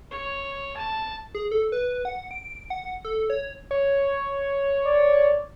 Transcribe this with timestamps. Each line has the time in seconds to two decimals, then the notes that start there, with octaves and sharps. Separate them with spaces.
0.11 C#5
0.76 A5
1.35 G#4
1.51 A4
1.72 B4
2.05 F#5
2.31 D7
2.70 F#5
3.05 A4
3.30 C#5
3.71 C#5
4.86 D5